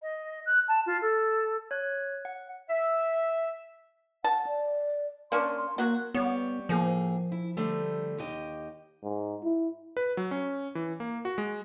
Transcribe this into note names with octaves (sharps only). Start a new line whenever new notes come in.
D#5
F#6
A5
F4
A4
C#5 F#6
F#5
E5
F#5 A5
D5
A#3 C#4 D4 C6
C6
F#3 A#3 F#4
G3 B3 C#5
A2 F3 A#3 G#4
E4
D3 G3 A3
D#2 G4 D#5
G#2
E4
B4
F#3
C#4
E3
A#3
F#4
G#3